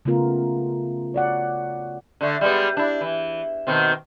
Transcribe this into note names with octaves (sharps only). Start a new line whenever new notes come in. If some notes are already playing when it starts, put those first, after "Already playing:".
C#3 A3 B3 F4 A#4
C#5 D5 F#5
D3 A3
G3 G#3 B3
D4 E4
E3
B2 D#3 C4